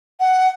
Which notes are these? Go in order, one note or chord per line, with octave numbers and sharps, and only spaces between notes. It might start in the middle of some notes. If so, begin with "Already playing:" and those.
F#5